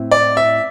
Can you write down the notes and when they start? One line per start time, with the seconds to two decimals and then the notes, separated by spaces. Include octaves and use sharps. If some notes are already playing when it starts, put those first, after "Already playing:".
Already playing: A2 C4 E4
0.11 D5
0.37 E5